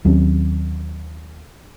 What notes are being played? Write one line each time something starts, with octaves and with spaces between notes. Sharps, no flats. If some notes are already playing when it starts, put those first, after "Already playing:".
D#2 F#3 C4 C#4